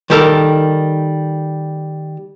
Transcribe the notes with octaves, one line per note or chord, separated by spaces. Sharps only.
D#3 G3 G4 A4 A#4